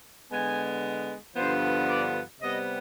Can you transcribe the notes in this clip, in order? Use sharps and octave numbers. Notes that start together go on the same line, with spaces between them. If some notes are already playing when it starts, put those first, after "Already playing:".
D3 G#3 B3 G#5
G2 D3 F3 B3 C5
D5
C3 G3 B3 D#5